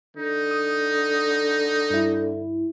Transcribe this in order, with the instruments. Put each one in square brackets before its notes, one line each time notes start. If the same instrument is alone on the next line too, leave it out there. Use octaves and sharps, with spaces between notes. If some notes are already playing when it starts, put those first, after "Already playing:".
[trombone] D3 [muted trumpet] D#4
[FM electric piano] D#6
G2 E4